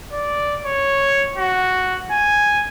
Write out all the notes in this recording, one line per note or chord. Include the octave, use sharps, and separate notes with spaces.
D5
C#5
F#4
G#5